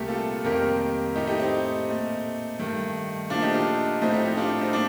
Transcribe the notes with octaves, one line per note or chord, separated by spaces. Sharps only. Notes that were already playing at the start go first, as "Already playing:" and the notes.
Already playing: C2 A#2 A3 G4 A#4
F4 A4
F2 C3 D#3 G3 A#3 G4 A#4
A2 A3 D#4 G4
D#4 G4
C4 D#4
A#2 A3
G2 D#3 A3
A#2 F3 A3 D4 F4
D#4 G4
D4 F4
A2 F3 A3 C4 D#4
D#4 G4
D#4 G4
D4 F4
C4 D#4
A#2 G3 D4